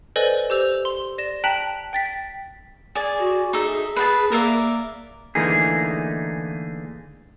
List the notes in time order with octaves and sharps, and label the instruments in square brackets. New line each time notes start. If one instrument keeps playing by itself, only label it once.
[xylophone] A4 B4 C5 D5 D#5 G#5
G4 C5 E6 F7
C6
D5 A#6 E7
G5 A5 A#5 F#6 B6 F#7
G5 A6 B6
[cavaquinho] G#4 D5 G#5
[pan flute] F#4
[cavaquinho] D#4 A4 E5 [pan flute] G#4
[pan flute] G#4 [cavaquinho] B4 G5 A5
[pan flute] A#3 [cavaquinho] A#4 D5 E5
[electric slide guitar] D3 E3 A3 A#3 D#4 G#4